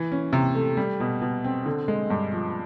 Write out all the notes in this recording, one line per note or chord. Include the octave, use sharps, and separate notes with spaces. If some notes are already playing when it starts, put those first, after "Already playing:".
Already playing: E3
C#4
C3
A3
G3
B2
B2
C4
D3
G#3
G2
F3